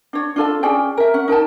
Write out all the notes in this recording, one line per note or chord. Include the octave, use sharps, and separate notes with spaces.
D4 C#5
D4 F4 A4 F5
C#4 G#4 D5 G5
A#4 E5
C#4 F#5
D#4 A#4 G5 A5